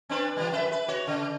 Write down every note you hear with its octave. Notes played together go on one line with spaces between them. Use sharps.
C4 D4 B4
E3 G3
F#2 B4 E5
B4
F#4 C#5
C#3